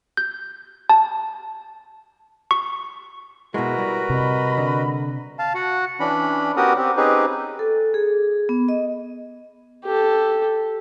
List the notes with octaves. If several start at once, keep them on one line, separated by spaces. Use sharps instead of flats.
G6
A5
C#6
B2 G#3 E4 F#4 A#4 B4
G3
C3 D#5 B5
D3
F5 A5
F#4 F#5
E3 C#4 D4 B5
B3 C#4 F#4 G4 A#4 D#6
C4 G4
C4 C#4 D#4 G4 G#4 B4
A4
G#4
B3
D#5
G4 A4